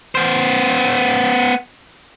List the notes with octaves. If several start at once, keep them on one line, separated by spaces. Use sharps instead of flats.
B3 C5